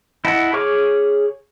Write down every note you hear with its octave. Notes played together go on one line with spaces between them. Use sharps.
E4 D#5 F#5 A5
G#4 C#5 C#6 D6 F6